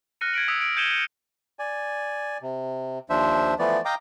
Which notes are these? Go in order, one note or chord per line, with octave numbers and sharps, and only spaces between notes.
F6 F#6 A#6 C#7 D#7
G#6 B6 D7 F#7
D#6 E6 B6
D7
G6 G#6 C#7 D#7 E7 G7
G6 C#7 D#7
D5 G#5
C3
D#2 F3 D4 C5 E5
E3 F3 A3 B3 D5
D#5 F5 G5 A#5 D6